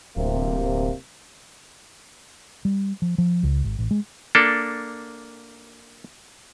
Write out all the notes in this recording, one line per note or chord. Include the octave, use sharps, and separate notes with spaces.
D1 C3 A#3
G3
F3
F3
C#2
G#1
A1
G#3
A#3 D4 A4